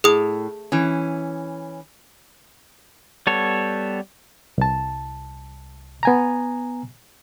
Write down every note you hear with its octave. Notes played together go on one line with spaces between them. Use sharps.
A2 G#4 D#6
E3 C#4
G3 B3 A4 C#5
C2 A5
B3 G#5 A#5